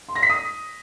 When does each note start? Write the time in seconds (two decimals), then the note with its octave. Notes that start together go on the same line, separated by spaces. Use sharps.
0.08 C6
0.16 A#6
0.23 B6
0.30 D#6